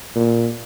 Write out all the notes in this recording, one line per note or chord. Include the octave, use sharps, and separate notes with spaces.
A#2